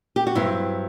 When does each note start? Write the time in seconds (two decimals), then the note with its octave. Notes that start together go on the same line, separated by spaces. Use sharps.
0.16 G4
0.27 F#4
0.35 G2 F#3 C4 E4